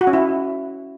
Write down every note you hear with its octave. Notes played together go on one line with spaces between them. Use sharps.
F#4
C#4
E4